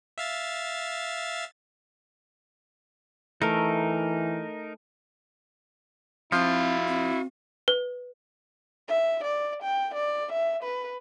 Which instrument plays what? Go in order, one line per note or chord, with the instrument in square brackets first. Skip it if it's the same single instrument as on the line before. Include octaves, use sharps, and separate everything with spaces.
[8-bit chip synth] E5 F5 A6
[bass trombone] E3 [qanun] A3 [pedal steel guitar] D#4 A#4
[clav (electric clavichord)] F3 [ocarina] C4 [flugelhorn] E4 [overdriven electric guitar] F#4 F5
[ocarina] C4
[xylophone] B4
[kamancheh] E5
D5
G5
D5
E5
B4